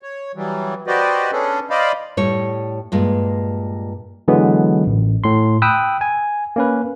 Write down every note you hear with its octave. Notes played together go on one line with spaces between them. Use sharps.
C#5
E3 F#3 G3
F#4 G4 B4 C5 D5 D#5
B3 C#4 D4 G#4 A4
C5 D5 D#5 F5 B5
A2 G3 C#5
G2 A#2 G#3
D3 E3 F#3 G#3 B3
A1
A2 C6
G5 B5 D#6 E6 F#6
G#5
A#3 C#4 B4